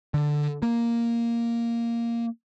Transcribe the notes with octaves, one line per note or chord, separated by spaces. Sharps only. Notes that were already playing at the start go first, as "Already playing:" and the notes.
D3
A#3